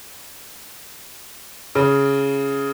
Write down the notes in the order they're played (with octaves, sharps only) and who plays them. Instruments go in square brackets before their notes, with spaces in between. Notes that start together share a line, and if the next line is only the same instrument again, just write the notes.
[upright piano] C#3